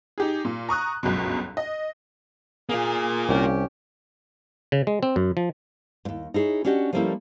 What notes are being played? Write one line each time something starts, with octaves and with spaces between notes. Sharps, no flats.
D#4 G4 G#4
A#2
A#5 C#6 D#6 F#6
G1 C#2 F#2 B2
D#5
A#3 F4 G#4
C2 C#4 G4
C#3
G#3
C4
F#2
F3
D#2 G#2
D#4 E4 G#4 C#5
C#4 D4 F#4 G4 D#5
F3 G3 A3 A#3 C#4 E4